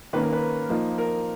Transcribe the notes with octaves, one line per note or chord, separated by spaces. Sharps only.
D#3 A#3 C#4 B4
A#4
B4
F3 A#3 D#4
A#4